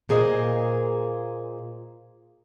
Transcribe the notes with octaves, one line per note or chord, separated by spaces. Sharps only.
A#2 A#3 G#4 C5 D#5